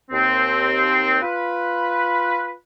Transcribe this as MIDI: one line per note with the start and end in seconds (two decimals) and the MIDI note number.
0.11 1.17 39
0.11 1.17 60
1.21 2.53 65
1.21 2.53 71